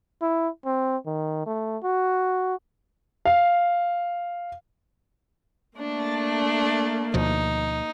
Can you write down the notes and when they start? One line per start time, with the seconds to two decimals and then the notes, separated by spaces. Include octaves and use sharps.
0.22 E4
0.66 C4
1.06 D#3
1.46 A3
1.84 F#4
3.25 F5
5.78 A3 A#3 D4
7.14 D2 B2 F3 D#4